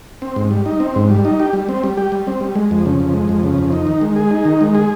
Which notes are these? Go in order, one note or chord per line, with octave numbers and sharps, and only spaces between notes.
C4
G#2
G3
D#4
C4
G#2
G3
D#4
G4
G3
C4
G3
G4
G3
C4
G3
G#3
F2
C#3
F2
G#3
F2
C#3
F2
D#4
D#3
G#3
G#4
D#4
D#3
G#3
G#4